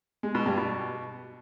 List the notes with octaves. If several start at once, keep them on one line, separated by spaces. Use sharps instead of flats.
G#3
B2
G2
B2